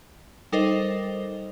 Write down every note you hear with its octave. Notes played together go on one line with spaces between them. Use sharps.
G3 D#4 A4 A#4 C5 D#5